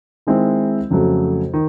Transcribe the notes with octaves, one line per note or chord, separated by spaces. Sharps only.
D#3 G#3 C4 E4
F2 C#3 F#3 A3
D#3